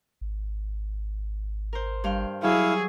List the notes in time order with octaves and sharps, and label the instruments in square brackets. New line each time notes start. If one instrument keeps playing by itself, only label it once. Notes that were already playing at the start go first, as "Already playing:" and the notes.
[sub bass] G#1
[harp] A#4 C5
G2 F5 G5
[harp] F#3 C#6 E6 [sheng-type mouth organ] E4 F5 [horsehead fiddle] G#4